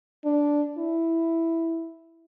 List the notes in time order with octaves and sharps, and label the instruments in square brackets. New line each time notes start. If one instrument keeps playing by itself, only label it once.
[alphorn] D4
E4